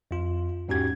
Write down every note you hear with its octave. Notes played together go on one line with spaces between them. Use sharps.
F2 F4
E2 G#2 C#4 F#4 G4 G#6